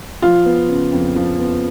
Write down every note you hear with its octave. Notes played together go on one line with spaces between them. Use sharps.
F3 F4
B3
C#3
F2
F3
B3